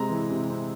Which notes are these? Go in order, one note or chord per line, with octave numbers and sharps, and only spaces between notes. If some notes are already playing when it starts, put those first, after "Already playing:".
Already playing: C3 G#3 C4 A#5
E3
C3
C4